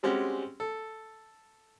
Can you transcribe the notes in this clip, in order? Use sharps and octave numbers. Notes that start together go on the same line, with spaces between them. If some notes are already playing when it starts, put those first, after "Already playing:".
G3 G#3 C4 C#4 F#4 G4
A4